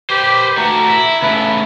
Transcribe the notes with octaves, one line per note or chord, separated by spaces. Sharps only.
G4 B4 C5
A3 F#4 A#5
E4
C#3 A3 B4